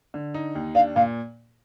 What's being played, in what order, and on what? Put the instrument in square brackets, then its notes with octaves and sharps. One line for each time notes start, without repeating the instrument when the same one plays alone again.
[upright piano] D3
D#4
D#2
[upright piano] D4 [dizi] F5
[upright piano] A#2 [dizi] F5